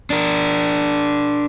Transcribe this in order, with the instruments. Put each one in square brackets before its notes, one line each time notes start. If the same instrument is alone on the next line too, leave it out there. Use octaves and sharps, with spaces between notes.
[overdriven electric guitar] D4 A#4